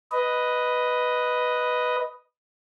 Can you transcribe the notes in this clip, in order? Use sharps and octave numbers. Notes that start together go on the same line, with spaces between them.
B4 D#5